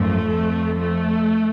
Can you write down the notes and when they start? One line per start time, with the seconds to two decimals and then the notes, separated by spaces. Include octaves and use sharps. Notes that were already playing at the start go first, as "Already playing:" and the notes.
Already playing: G#1 F#2 F3 A3
0.28 F2 F3
0.77 A3